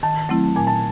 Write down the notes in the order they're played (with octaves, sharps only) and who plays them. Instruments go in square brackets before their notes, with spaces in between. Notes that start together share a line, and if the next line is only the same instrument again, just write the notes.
[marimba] D#3 [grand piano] A5
[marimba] F#3 A3 C4 E4
[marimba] A#2 [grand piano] G#5
[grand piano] A5